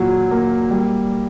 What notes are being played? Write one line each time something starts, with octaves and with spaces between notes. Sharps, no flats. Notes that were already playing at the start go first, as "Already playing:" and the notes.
Already playing: A#2 F#3
A#3
G3